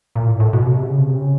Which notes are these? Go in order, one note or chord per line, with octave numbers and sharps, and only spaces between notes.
A#2
A2
A2
B2
C3
C#3
C3
C#3